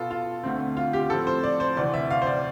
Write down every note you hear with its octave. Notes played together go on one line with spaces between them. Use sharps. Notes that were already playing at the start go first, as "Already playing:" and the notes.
Already playing: B2 B3 F4 A4
F4
D2 D3 A3 C4
F4
G4
A2 F3 C4 A4
C5
D5
C5
D2 C3 E3 D5
E5
F5
C5
D5